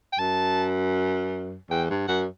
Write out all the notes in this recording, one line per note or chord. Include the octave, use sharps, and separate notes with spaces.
G5
F#2 A5
E2 G5
G2
F#2 F#5